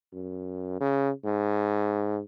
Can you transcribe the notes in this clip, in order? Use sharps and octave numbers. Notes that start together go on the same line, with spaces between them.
F#2
C#3
G#2